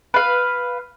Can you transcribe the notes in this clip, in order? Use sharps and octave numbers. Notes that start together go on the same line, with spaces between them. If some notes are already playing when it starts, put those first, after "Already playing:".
B4 F5